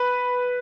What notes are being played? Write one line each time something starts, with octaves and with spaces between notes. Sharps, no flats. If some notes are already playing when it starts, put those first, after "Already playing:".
Already playing: B4